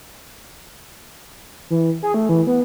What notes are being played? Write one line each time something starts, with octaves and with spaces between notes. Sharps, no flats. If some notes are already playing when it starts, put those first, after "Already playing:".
E3
G#4
A3
E3
B3